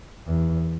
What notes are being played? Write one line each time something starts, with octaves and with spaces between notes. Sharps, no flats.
E2